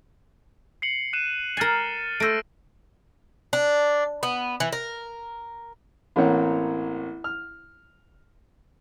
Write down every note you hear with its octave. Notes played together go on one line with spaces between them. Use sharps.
C7 C#7 F#7
F#6 D#7 E7
A#4 G#5 F6 A6 C7
A3 C5 E6 A#6 D7
D4
B3
E3
A#4
A1 A#3 C4 C#5 F#5
F6